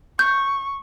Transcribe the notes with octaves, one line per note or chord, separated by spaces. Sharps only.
C#6 G6